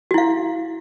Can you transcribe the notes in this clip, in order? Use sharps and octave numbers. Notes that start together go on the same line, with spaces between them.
E4 F#4 F5